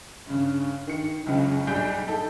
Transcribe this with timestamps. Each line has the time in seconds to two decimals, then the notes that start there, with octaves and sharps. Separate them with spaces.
0.27 G2 C#3
0.87 D#3 C#7
1.26 F#1 C#2 C#3
1.67 B1 G3 G#4 G6 D7
2.07 D#4 A4